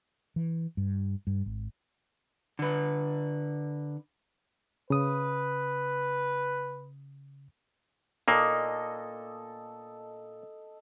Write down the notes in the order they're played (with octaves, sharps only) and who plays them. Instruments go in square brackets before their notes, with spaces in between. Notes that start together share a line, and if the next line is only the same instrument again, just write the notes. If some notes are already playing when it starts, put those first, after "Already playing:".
[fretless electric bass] E3
G2
G2
G#1
[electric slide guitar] D3 B4
[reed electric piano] C#3 D#6 [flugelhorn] B4
[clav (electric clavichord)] A#2 A#3 [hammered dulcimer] A4 D#5